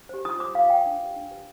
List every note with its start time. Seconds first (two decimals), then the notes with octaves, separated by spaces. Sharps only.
0.09 G4 C5
0.25 F4 D#6
0.39 C5 D6
0.54 F4 F5
0.70 C5 G5
0.86 D4
1.00 G4 B4
1.15 D4
1.30 G4 B4